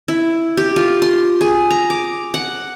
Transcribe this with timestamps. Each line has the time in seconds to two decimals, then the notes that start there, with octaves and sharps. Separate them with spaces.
0.08 E4
0.57 G4
0.76 F4
1.02 C6
1.41 G#4
1.71 A#5
1.90 D6
2.34 F#5